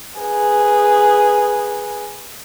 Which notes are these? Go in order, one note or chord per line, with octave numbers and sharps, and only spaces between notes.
G#4 B4